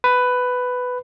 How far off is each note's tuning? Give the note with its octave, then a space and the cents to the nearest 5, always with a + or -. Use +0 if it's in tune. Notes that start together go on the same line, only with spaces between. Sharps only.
B4 +10